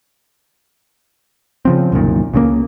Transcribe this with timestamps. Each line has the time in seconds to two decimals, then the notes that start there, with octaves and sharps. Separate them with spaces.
1.65 C#3 F3 C4
1.92 C2 F#2 A#2 D#3
2.33 C#2 C#3 A#3